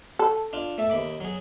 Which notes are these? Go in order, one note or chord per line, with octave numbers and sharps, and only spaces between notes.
A4
D4 F4
A3 E5 A5
D#2 B5 D6
F#3 G#4